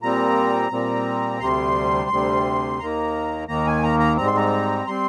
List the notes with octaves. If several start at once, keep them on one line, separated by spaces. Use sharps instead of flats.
A#2 G3 C4 A#5
A#2 G3 C4
D2 C3 G3 C6
D2 C3 G3
D#2 D#3 A#3 A#5
D#2 D#3 A#3 A#5
G#5
A#5
A#5
G#2 G3 C4 A#5
C6
A#5
G3 C4 C6